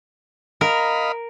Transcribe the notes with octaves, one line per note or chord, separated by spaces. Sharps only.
A#4 D#5 F5 B5